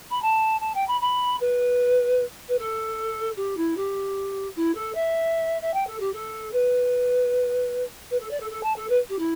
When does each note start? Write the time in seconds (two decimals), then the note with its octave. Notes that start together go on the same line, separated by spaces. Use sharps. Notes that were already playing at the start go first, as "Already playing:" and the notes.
0.11 B5
0.22 A5
0.61 A5
0.75 G5
0.88 B5
1.01 B5
1.41 B4
2.48 B4
2.59 A4
3.37 G4
3.57 E4
3.77 G4
4.56 E4
4.75 A4
4.95 E5
5.62 E5
5.74 G5
5.87 A4
6.00 G4
6.13 A4
6.53 B4
8.11 B4
8.20 A4
8.31 D5
8.40 A4
8.50 A4
8.63 A5
8.76 A4
8.89 B4
9.09 G4
9.19 E4